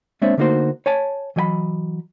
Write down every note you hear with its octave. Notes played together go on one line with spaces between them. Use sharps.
G#3 A#3 C4 D4 C#5 E5
D3 A3 A#3 D#4 F#4 C5
C#5 G#5 A5
E3 F#3 D#5 G5 B5